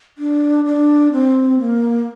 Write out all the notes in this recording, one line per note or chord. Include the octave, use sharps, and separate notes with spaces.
D4
D4
C4
A#3